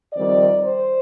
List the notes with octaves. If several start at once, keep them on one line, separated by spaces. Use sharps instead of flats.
F2 D#3 G3 C4 D5
C5